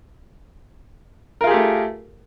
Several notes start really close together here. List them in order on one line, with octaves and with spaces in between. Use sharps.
A#4 F4 G#4 G4 A3